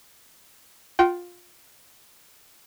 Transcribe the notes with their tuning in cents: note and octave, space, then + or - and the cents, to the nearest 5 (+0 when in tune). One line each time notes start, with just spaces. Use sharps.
F4 +15 G5 -25